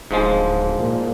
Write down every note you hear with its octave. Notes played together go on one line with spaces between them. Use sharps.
D1 G#2 F3 G#3
A#2